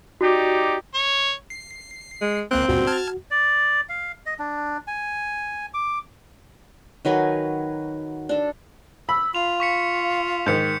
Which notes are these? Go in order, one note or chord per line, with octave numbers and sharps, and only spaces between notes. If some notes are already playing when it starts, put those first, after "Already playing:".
D#4 F#4 G4 D5
C#5
C7
G#3
C#2 A#3 C4 F#6
C#2 G2 A#2 F#4
A5 F6 G#6
D5
F5
D#5
D4
G#5
D6
D#3 F#3 B4 G#5
D4 A4
B5 E6
F4 F5 F7
C#6 B6 C#7
G#2 D#3 G6 C#7